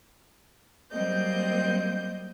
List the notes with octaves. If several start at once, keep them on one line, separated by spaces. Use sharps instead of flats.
F#3 G3 A#3 C4 D#5 G6